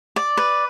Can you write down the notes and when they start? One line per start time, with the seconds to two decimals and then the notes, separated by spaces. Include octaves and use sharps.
0.16 D5
0.37 B4